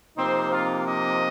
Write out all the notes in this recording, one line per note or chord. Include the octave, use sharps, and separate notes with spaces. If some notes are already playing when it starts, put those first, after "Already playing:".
C3 F3 A#3 C4 D#4 C5
F4 F5
D#4 D#5